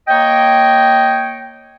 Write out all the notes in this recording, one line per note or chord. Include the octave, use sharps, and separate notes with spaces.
A#3 C#5 D#5 G5